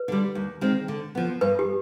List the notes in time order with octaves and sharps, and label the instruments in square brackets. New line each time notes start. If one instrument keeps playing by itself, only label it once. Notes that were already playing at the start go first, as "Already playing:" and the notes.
Already playing: [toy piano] B4
[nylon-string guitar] D3 G3
D#2
D#3 G#3 C4
D3
F3 B3
[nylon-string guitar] G2 [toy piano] B4
[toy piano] G4